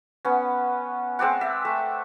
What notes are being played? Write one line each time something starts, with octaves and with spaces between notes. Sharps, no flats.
B3 C#4
G#3 C4 D5 F#5
E5
A3